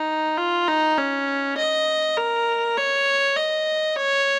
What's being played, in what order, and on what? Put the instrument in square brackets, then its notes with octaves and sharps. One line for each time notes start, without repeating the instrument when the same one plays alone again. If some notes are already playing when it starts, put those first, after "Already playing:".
Already playing: [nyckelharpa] D#4
F4
D#4
C#4
D#5
A#4
C#5
D#5
C#5